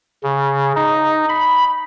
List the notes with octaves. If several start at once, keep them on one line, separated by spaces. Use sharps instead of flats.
C#3
D#4
B5